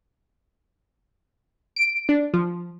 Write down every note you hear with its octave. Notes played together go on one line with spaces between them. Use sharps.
D7
D4
F3